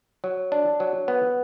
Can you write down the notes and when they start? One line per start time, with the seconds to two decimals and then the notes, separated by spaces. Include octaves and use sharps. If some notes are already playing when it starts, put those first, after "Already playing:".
0.24 F#3
0.52 D4
0.80 F#3
1.08 B3